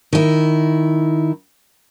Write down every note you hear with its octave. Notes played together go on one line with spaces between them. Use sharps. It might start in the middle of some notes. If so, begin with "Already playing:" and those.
D#3 E4